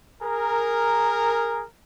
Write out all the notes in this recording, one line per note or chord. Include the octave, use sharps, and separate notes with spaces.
G#4 A#4